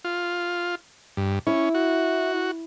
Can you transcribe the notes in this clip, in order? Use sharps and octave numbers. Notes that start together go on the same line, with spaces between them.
F4
G2
C#4 E4
F#4